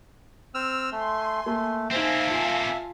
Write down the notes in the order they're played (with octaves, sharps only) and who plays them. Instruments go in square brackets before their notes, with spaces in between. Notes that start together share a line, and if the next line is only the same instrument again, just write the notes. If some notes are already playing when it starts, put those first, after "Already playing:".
[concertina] C4 E6 F6
[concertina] A3 [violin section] G#5 C6
[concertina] A3 [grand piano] A#3
[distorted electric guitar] A#3 C4 [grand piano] D#4 C5 [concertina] E5 [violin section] F5 G#5 A5
[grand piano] F4